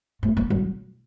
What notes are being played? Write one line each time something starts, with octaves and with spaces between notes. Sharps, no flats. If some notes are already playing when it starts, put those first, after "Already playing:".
A3
A#3
F#3